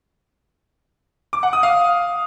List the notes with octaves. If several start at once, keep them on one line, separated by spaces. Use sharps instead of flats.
D6
F#5
D#6
F5